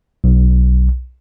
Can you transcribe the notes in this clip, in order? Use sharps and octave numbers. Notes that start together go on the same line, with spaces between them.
B1